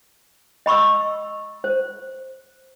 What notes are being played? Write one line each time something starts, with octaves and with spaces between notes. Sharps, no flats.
D#5 B5 C#6 E6
C5